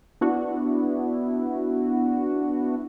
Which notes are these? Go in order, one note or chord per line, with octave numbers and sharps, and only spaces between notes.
B3 D4 E4 F#4